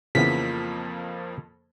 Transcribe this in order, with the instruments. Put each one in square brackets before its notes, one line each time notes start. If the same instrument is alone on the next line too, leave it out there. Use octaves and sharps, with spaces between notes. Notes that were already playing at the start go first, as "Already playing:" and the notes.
[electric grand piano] F2 F3 A#3 [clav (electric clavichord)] C#3 E3 B3 [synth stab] B6